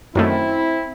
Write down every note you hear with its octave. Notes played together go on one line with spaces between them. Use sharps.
F#2 D#3 A3 C4 E4